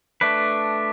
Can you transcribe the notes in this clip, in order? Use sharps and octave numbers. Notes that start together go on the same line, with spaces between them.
A3 D4 B4